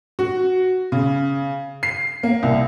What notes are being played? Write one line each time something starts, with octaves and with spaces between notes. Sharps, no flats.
F#4
C#3
C7
A#3
C2